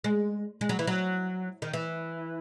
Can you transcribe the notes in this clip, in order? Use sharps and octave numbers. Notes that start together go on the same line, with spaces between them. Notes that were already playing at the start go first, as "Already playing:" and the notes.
G#3
G#3
F#3
E3
F#3
D#3
E3